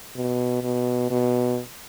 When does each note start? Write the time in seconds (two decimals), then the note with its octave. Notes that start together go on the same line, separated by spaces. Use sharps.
0.17 B2
0.63 B2
1.10 B2